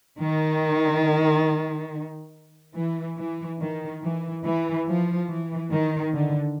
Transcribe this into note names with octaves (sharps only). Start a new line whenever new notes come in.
D#3
E3
E3
D#3
E3
E3
F3
E3
D#3
D3